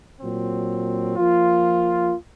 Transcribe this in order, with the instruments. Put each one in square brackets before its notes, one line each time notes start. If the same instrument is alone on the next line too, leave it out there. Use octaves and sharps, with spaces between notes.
[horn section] A#2 F#3 C4
F3 A#3 F4